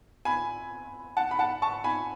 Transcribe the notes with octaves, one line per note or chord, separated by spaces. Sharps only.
G#5 B5
F#5 A5
B5
F#5 A5
A5 C#6
G#5 B5